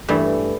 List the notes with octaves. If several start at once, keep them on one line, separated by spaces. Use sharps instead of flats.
G2 E3 A3